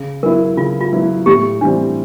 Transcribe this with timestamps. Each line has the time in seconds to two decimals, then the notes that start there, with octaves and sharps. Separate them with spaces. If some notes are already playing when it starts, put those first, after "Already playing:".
Already playing: C#3
0.23 F#3 B3 E4 A#4
0.57 C#3 F4
0.81 F4
0.93 F#3 B3 E4
1.26 A2 G4
1.61 E3 G3 C4 D4